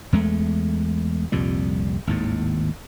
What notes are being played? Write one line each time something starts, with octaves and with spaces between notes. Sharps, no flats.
E2 G#3 A3
C2 F2 A#2 G3
G#1 D#2 A2